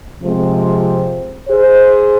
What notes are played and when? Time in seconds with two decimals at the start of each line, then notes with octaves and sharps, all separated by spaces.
0.23 C3 F3 G#3 C4
1.49 G#4 C5